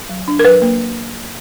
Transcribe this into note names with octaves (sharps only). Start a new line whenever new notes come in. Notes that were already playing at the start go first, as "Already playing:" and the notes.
F#3
D4
A#4
F#3 B4
A#3